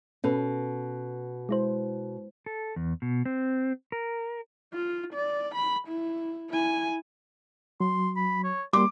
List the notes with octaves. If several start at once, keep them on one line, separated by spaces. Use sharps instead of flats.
B2 C#4 A4 B4
G#3 E4 C5
A4
E2
B2
C4
A#4
F4
D5
B5
E4
E4 G#5
F#3 C6
B5
C#5
G3 A#3 C6 D6